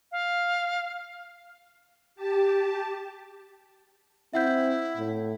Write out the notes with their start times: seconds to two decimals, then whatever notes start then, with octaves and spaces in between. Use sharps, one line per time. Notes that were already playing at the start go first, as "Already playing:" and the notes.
0.12 F5
2.16 G4 A5
4.34 C4 E4 E5 F#5 G6
4.97 A2